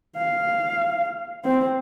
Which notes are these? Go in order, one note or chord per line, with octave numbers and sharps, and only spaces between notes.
F5
C4